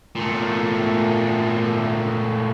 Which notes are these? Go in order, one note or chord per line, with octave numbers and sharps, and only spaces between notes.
A#2 A3